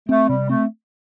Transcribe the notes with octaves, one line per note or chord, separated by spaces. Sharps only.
A3 C4
C3 G3
A3 C4